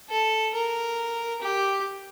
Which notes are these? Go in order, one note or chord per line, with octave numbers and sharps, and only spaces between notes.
A4
A#4
G4